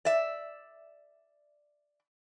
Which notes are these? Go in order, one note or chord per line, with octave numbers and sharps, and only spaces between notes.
D5 E5